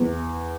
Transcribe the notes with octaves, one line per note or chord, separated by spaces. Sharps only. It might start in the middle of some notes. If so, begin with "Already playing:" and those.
Already playing: E2